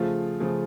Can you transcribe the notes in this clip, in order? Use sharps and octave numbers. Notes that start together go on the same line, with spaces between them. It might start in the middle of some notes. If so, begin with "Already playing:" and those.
Already playing: C#3 F3 A3 F4
C#3 F3 A3